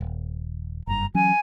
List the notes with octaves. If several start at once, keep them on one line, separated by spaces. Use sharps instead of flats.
D#1
F#1 G2 A#5
E3 F#3 C#4 G#5